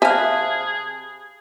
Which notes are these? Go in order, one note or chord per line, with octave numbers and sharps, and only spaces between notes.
C3 G#4 E5 F5 G#5 A5 B5 F#6